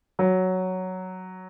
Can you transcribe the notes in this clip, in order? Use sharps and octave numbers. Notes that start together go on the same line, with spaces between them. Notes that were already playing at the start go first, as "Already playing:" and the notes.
F#3